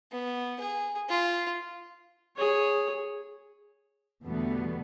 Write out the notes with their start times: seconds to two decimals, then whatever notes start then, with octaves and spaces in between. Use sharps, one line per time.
0.12 B3
0.60 G#4
1.09 F4
2.36 G#4 C#5
4.24 E2 B2 D3 G3 A3 B3